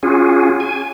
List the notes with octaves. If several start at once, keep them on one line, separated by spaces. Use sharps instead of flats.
C#4 F4 F#4 G#4
G#5